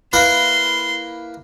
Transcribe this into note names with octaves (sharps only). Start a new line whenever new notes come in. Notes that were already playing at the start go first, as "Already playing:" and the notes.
A#3 E4 B4 C6